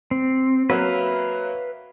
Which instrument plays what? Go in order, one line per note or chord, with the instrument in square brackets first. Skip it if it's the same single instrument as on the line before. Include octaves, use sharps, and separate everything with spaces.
[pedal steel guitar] C4
[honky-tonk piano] F#3 A#3 F#4 [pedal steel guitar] B4 E5 F5